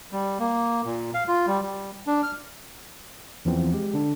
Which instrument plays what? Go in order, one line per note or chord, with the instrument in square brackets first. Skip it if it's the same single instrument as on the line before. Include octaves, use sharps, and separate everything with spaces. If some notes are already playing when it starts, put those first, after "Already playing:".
[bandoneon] G3
A#3
A#2
F5
F4
G3
G3
D4
F6
[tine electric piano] E2 E3 F3 B3 C4
G#3 G4
D3 D4